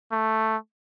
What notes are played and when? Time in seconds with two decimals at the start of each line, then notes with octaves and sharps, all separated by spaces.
0.12 A3